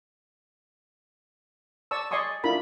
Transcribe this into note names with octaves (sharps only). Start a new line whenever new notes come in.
D5 A5 C#6 E6
D5 D#5 G#5 C6 C#6 D#6
D4 E4 F4 A#4 B5